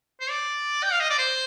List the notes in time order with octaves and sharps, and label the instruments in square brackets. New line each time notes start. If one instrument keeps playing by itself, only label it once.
[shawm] C5
D5
G5
F5
D#5
D5
C5